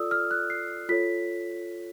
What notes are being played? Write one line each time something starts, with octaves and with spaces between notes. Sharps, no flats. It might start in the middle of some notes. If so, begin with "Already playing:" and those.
Already playing: F4 A4 D5 D#6 E6
F6
F#6
C7
F4 A4 C#5 B6